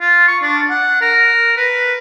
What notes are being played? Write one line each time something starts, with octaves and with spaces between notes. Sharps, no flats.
F4
C#6
D4
F#5
A#4
B4